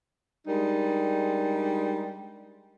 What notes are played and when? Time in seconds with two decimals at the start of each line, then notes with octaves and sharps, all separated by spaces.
0.46 G3 G#3 D4 D#4 A#4